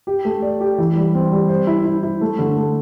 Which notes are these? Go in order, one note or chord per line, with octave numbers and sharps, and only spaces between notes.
G4
A3
D5
G4
E3
G3
C4
G3
C5
E4
E4
E4
A3
D3
A3